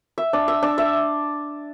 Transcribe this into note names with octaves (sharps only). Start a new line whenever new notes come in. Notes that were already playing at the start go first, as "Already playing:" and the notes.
E5
D4
E5
D4
E5